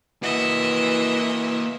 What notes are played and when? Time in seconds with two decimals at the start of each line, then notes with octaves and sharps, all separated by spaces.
0.23 E3 A#3 F#4 D#5 E5